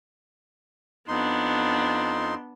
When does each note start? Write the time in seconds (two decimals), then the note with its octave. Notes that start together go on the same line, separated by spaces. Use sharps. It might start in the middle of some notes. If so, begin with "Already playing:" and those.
1.08 F2 B3 D4 D#4 C6